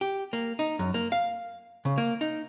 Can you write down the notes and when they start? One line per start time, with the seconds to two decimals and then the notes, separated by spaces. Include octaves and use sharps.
0.01 G4
0.33 A#3
0.59 D#4
0.79 F#2
0.94 A#3
1.12 F5
1.85 C#3
1.98 A#3
2.21 D#4